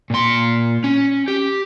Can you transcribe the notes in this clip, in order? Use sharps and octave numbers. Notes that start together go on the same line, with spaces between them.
A#2 C6
C#4
G4